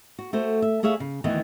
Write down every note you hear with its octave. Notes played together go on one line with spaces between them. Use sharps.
F#4
A3 F#4 C5
E5
A3 G#4 C#5 E5 F5
C#3
D2 D#3 E3 B3